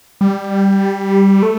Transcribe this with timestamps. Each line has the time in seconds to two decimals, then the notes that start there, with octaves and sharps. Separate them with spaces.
0.21 G3
1.42 A3